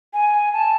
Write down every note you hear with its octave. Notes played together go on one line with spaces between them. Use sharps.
G#5
A5